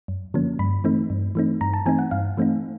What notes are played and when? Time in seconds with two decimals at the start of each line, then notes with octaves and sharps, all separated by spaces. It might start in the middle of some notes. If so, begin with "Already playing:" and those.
0.08 F#2
0.34 D3 F3 A#3 C#4
0.59 G2 B5
0.84 E3 A3 C4 D#4
1.10 G2
1.35 E3 A3 C4 D#4
1.61 G2 A#5
1.74 A5
1.86 E3 A3 C4 D#4 G#5
1.99 F#5
2.11 G2 F5
2.37 E3 A3 C4 D#4